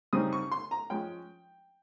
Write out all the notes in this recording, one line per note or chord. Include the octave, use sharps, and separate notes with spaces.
C#3 G3 C4 D#4 D#6
C#6
C6
A#5
F3 G#3 C#4 G5